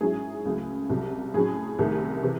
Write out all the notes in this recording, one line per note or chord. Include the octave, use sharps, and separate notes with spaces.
G#2 F#3 C#4 E4 G#4
C#2 C#3 F#3 A3
C2 C3 F#3
A2 F#3 C#4 G#4
C2 C3 D#3 A3
C3 E3